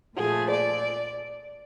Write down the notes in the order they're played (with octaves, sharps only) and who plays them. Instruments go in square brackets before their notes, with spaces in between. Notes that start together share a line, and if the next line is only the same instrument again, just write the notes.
[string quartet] A#2 F3 A3 G#4
D5